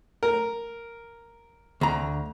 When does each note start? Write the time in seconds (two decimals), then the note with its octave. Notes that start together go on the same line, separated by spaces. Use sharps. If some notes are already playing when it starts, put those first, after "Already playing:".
0.23 A#4
1.81 D2 A#5